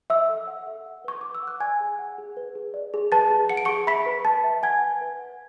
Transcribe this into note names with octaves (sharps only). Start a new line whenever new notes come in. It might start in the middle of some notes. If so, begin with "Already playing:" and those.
C#5 E5 E6
A4
F#5
A4
F#5
B4 C#6
B4 D6
E6
F#5 F#6
D5 G#5 G#6
G#4
F#5
G#4
B4
G#4
D5
G#4
B4 A5 A6
G#4
F#5 C#7
D7
G#4 C#6 C#7
E5 B5 B6
B4
B4 A5 A6
E5
F#5 G#5 G#6
B4
B4
F#5